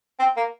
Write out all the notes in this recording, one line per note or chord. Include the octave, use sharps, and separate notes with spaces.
C4
A#3